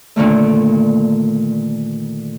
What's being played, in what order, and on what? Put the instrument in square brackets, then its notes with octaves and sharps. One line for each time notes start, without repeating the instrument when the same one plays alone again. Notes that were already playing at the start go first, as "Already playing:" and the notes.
[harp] A#2 D3 D#3 A3